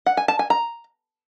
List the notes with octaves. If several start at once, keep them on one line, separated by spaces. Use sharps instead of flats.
F#5
G#5
A5
G#5
A#5